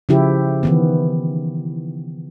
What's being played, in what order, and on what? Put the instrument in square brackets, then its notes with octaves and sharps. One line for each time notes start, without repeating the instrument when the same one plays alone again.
[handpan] C#3 F3 E4 G4
D#3 E3 B3